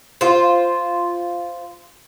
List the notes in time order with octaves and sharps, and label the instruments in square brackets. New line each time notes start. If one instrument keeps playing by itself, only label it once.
[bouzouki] F4 C5